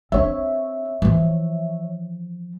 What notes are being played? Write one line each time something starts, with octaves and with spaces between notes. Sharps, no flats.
C4 D4 C#5 E5
E3 F3